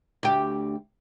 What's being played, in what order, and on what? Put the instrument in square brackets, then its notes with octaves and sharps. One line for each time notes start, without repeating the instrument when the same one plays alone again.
[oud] D2 G4